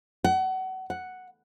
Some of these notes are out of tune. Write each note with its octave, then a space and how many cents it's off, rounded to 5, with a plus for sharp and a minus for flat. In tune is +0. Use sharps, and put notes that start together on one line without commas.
F#5 +30
F#5 +0